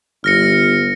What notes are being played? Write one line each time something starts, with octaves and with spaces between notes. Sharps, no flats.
G1 F6 A#6 C#7